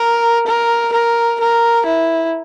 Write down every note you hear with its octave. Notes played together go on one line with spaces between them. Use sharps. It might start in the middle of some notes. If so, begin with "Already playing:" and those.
Already playing: A#4
A#4
A#4
A#4
E4